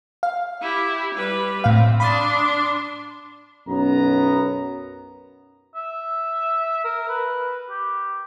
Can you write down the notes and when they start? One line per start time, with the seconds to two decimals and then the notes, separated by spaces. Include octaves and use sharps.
0.23 F5
0.61 E4 G4
1.15 G3 B4
1.64 A2 C4 F5
2.00 D4 B5 C6 D#6 A6
3.67 B1 F#2 B3 A#5
5.75 E5
6.84 A#4
7.09 B4
7.70 G4